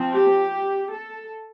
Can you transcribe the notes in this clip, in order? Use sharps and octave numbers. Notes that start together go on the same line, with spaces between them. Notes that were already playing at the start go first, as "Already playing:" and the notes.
Already playing: F3 C4
G4
A4